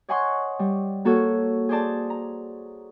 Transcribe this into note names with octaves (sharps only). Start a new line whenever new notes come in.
C#5 D#5 F#5 G#5 C6 C#6
G3
A#3 F#4 A4 C#5
G#4 C5 D5 A5
A#5